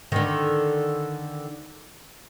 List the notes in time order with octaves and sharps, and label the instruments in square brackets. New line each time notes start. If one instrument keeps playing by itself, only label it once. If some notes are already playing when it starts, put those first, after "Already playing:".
[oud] D3 D#3